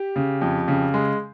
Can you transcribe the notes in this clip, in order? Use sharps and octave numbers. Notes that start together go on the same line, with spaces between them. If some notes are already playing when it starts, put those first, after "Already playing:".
Already playing: G4
C#3
F2
C#3
G#3